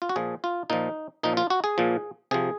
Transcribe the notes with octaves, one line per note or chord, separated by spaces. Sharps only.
F4
F#4
A#2 F3 G#4
F4
A#2 F3 D#4
A#2 F3 D#4
F4
F#4
G#4
A#2 F3
C3 F3 G#4